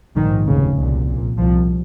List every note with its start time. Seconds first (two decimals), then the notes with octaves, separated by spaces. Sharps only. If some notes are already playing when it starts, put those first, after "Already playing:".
0.16 A#1 G#2 D#3
0.47 F1 D#2 C#3
0.77 C2 A#2
1.07 A#1 A#2
1.37 C2 C3 F3